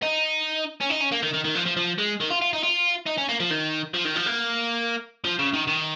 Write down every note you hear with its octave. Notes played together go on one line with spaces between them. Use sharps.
D#4
C#4
D#4
C#4
A#3
D#3
D#3
D#3
F3
F3
F3
G#3
D#3
F4
F4
D#4
F4
D#4
C#4
A#3
F3
D#3
F3
D#3
F3
A#3
F3
C#3
D#3
D#3